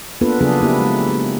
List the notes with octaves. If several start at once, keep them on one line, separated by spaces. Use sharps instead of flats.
A#3 B3 D4 F4 A4 B4
C#3 F3 F#3 B3 D4 G#4
A#3 B3 E4 G4
G#3